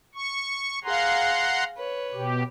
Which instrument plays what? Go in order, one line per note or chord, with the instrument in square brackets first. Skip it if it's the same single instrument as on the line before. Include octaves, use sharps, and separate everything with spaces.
[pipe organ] C#6
[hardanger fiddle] G#4 F5 [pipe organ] F#5 A#5 C6
[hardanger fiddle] B4 C#5
[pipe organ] B2 G4